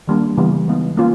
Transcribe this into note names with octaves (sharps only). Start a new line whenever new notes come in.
D#3 G3 A#3 D4
C#3 E3 G3 B3
G#3 B3 D#4
A#3 C#4 F4